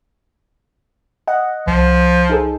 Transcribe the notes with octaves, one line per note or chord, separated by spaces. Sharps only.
D#5 F#5
C2 F3
D#4 G#4 A4